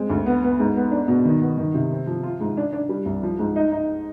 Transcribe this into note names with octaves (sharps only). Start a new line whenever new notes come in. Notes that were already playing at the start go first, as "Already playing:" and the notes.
Already playing: G#3 C4
D2
B3
B3
G#2
B3
D4
B2
D#3
B3
D#3
C3
C4
F3
F4
G#2
D4
D4
G3
C2
F3
G#2
D#4
D#4